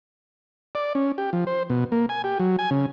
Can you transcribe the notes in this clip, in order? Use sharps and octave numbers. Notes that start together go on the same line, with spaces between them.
D5
C#4
G4
F3
C5
B2
A#3
G#5
G4
F#3
G#5
C#3